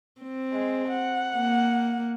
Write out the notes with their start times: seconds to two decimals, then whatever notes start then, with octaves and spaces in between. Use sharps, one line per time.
0.21 C4
0.52 G#3
0.88 F#5
1.36 A#3